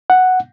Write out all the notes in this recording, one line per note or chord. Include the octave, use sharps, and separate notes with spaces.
F#5